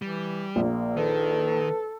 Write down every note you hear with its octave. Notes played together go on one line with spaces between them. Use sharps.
E3 G3
A#1 A#3
D#3 A4 B4